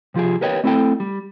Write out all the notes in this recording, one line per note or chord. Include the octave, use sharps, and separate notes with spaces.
C3 F3 F4 G4 G#4
G4 A#4 B4 C#5 D#5 G5
A3 C4 E4 A4 G5
G3